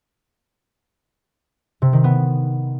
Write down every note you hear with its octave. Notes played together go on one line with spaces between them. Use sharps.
C3
D#3
B3